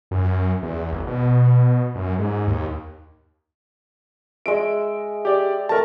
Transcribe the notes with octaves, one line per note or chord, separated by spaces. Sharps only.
F#2
E2
G#1
B2
F#2
G#2
D#2
G#3 D#5 E5 D7
G4 D5
A3 A4 A#4 A5 E6